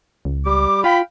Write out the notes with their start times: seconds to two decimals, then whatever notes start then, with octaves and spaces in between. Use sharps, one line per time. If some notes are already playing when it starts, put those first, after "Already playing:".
0.25 C#2
0.46 G3 G4 D6
0.84 F4 F5 G5 B5